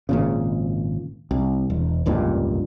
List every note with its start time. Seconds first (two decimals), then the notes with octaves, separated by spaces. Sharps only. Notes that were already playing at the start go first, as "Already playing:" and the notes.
0.09 G#1 A#2 C#3
1.31 C2
1.70 E1
2.06 F1 C#2 G2 A#2